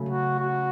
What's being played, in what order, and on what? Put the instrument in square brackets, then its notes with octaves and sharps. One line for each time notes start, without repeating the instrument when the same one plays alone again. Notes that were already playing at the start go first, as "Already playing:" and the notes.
Already playing: [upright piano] C#3 F#3 A3
[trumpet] F#4
F#4